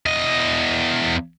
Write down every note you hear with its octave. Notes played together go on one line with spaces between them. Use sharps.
E2 D#5